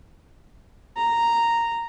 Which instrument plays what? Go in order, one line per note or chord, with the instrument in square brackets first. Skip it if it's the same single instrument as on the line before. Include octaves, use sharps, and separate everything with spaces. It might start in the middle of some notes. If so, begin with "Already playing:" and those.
[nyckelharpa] A#5